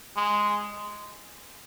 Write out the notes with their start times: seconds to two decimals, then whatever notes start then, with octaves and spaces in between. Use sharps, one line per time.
0.16 G#3